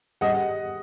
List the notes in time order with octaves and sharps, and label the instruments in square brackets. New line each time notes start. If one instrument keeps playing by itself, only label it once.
[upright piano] G3 D#5 F#5